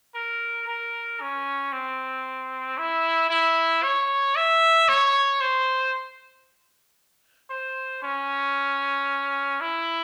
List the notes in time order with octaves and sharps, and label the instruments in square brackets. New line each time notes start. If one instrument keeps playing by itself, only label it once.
[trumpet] A#4
A#4
C#4
C4
E4
E4
C#5
E5
C#5
C5
C5
C#4
E4